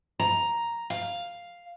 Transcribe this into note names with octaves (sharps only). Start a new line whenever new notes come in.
A#5
F5